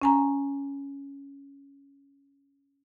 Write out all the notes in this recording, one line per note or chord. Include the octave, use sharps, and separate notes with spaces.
C#4 G#5 A#5